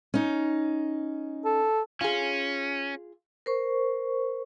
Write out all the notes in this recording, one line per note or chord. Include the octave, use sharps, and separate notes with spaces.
C#4 D#4
A4
C#4 F4 G#4
A#4 C5 C#6